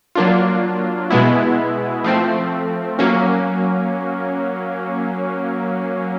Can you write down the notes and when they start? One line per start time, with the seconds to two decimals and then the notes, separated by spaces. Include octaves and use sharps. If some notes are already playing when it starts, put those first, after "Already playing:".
0.15 F#3 A#3 D4 F4
1.11 B2 G#3 B3 E4
2.04 F3 A3 C4
2.99 F#3 A#3 C#4